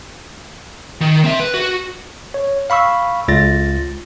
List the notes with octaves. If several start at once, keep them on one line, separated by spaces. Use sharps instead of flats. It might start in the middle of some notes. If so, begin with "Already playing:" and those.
D#3
C4 E5
B4
F#4
C#5
F5 B5 C#6 E6
C#2 F4 A6 A#6